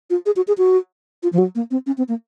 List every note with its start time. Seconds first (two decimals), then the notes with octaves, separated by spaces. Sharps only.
0.10 F4
0.26 G#4
0.36 F#4
0.48 G#4
0.58 F#4
1.23 F4
1.33 F3
1.38 F#3
1.55 A#3
1.71 C4
1.86 C#4
1.98 C4
2.08 A#3